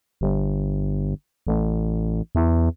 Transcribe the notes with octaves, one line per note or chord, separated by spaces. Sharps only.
G1
A1
E2